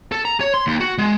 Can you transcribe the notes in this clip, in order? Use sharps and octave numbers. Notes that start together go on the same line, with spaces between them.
A4
A#5
C#5
C6
D#2
F#4
G#3